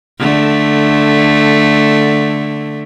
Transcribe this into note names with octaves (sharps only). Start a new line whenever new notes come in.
D3 A3